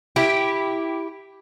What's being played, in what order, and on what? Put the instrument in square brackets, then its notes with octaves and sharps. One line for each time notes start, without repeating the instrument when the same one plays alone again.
[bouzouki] E4 G4